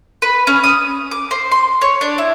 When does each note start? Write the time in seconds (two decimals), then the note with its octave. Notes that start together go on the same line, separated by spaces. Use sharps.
0.22 B4
0.47 C#4
0.64 D#6
1.11 D6
1.31 C5
1.51 C6
1.81 C#5
2.01 D4
2.18 E4